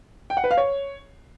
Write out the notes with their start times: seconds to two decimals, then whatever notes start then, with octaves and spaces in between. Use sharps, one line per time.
0.30 G5
0.37 F#5
0.44 B4
0.51 F5
0.57 C#5